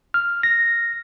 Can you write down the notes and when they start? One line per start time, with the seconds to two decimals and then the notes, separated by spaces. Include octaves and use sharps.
0.14 F6
0.43 A#6